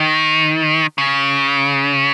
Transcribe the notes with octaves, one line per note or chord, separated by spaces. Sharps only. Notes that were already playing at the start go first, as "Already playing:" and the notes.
Already playing: D#3
C#3